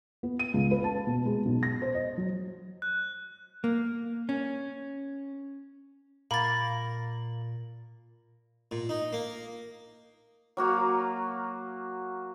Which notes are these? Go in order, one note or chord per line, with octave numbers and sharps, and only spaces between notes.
B3
D#7
C#2
B4
A5
B2
G#3
B1
A#6
C5
D#5
F#3
F#6
A#3
C#4
A#2 A#3 B5 A6
A#2
D#4
A#3
F#3 A#3 F#4 F5